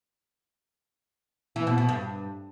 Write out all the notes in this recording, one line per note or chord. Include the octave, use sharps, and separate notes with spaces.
E3
B2
B2
G2